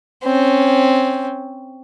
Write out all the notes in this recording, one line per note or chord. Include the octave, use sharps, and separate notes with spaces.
C4 C#4